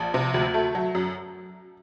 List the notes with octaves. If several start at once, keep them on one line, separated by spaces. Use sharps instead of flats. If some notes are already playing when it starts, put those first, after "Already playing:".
Already playing: A#1 A5
C3
D2
A3
F#3
F#2